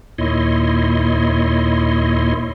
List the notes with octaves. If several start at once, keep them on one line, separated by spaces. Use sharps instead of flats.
D#2 A#2 E4 C#5 D#5 C6